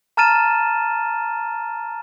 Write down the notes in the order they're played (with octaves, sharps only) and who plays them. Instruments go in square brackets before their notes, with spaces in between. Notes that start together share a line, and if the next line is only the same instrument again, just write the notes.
[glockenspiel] A5 A#5 F6 A6 D#7 E7